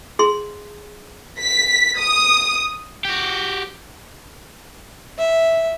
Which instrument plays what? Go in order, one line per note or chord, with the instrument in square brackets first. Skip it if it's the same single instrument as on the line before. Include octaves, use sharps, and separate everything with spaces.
[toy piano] G#4 C6
[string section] B6
D#6
[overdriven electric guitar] F#4 G4
[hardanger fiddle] E5